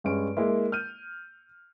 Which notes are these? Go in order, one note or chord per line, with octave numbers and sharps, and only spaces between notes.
G2 G#3 C#4 D7
G#3 A#3 E4
F6 G6 D#7